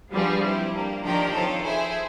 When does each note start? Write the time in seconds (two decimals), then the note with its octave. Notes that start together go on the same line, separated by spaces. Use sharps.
0.12 F3 G3 B3 D4 F4 G#4
0.43 C4 E4 G4
0.74 A#3 D4 G4
1.03 D#3 F3 D4 G4 A#4 D5 G5
1.35 C4 F4 A4 C#5
1.64 E4 G#4 C5 E5 G#5